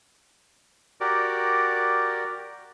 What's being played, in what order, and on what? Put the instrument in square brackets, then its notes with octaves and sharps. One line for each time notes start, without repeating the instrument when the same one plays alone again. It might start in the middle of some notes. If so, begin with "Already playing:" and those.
[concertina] F#4 G4 A#4 D5